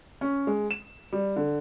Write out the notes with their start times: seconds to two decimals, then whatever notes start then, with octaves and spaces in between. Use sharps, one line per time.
0.21 C#4
0.47 G#3
0.71 E7
1.12 G3
1.36 D3